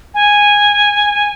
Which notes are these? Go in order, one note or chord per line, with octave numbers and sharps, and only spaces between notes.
G#5